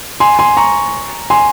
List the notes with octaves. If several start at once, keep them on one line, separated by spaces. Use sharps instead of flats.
G#5 C6
G#5 C6
A#5 C#6
G#5 C6